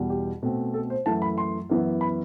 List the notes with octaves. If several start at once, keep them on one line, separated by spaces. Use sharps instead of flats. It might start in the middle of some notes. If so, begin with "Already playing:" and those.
Already playing: E2 B2 G3
G4
B2 A3 C4
A4
C5
F#2 E3 A3 A5
B5
C6
F#2 E3 B3
B5